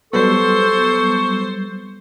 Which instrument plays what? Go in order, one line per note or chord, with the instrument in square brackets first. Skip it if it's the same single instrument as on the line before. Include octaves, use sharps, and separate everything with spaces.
[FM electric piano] F#3 G3 B3 [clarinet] A4 [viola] C5 [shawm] C#6